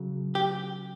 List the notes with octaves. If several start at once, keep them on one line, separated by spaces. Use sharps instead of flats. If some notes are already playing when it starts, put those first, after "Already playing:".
Already playing: C#3 F#3
G4